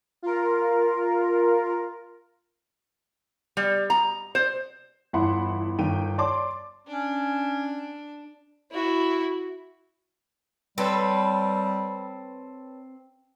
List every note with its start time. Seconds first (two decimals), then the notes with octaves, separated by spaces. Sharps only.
0.22 F4 A#4
3.57 G3
3.90 A#5
4.35 C5
5.13 G1 E2 E4 F#5 B5 C6
5.79 G1 D#3 G5 D#7
6.18 C#5 D5 A5 C6 D6
6.87 C#4 D4
8.71 E4 F#4
10.78 G3 C4 A4 B4 C#5